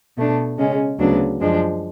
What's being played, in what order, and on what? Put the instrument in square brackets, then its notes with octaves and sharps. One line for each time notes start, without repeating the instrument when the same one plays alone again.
[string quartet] B2 A3 D4
C#3 G#3 C#4
D2 C#3 F#3 B3 D4
F#2 F3 G#3 D4